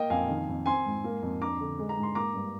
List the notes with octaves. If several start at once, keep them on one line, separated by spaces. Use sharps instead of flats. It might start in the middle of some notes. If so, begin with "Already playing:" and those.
Already playing: A#3 D#5 G5
F2 F5 G#5
D#3
F2
C4 G#5 C6
G#2
A#3
F2
D4 A#5 D6
D3
G#3
A#5
G#2
C6
A#3 A#5 D6
G2